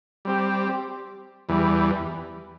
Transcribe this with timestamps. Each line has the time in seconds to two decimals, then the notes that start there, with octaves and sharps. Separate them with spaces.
0.25 G3 C4 G4
1.49 E2 E3 G3